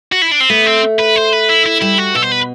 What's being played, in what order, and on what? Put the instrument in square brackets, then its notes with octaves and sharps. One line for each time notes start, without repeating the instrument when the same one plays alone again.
[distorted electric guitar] F#4
E4
D4
C4
[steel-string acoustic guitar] A3 [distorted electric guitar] B3
[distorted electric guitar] C4
B4
C5
B4
E4
E4
[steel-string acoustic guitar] G3 [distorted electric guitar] E4
[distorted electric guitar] F#4
[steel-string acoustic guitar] B2 [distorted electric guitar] A4
[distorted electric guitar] C5
B4